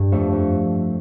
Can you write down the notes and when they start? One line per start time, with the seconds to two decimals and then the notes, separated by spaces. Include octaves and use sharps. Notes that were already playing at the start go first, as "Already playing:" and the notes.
Already playing: G2
0.12 F2 A3
0.33 F2